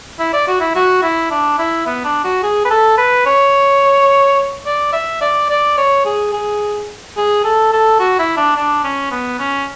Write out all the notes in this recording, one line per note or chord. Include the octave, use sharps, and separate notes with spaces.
E4
D5
F#4
E4
F#4
E4
D4
E4
B3
D4
F#4
G#4
B4
A4
B4
C#5
D5
E5
D5
D5
C#5
G#4
G#4
G#4
A4
A4
F#4
E4
D4
D4
C#4
B3
C#4